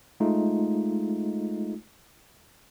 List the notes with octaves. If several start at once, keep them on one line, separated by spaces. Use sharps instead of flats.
G#3 A3 D#4 F4